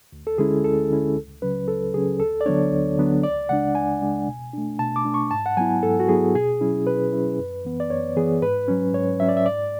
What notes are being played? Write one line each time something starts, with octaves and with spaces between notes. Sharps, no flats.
D2
A4
D3 G#3 C#4 E4 G#4
D2 A4
D3 G#3 C#4 E4
C#2
C#3 F#3 C#4 B4
C#2 A4
C#3 F#3 C#4 G#4
D2 A4
D5
D3 F#3 B3 D4 C#5
D2
D3 F#3 B3 D4
C#2 D5
C#3 G#3 D4 F#5
C#2 G#5
C#3 G#3 D4
B2
A3 D4
B2 A5
D6
A3 D4
C#6
G#2 A5
F#5
F#3 B3 E4 G#5
G#2 A4
F#4
F#3 B3 E4 G#4
B2 G#4
F#3 C#4 E4
B2 B4
F#3 C#4 E4
F#2
E3 B3
D5
F#2 C#5
E3 B3 G#4
G#2 B4
F#3 C#4
G#2 C#5
F#3 C#4 E5
D5
E5
G#2 D5